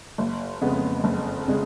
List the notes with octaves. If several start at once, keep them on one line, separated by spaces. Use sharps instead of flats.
F#1
F2 C#3 G#3 B3
F#1
C#3 G#3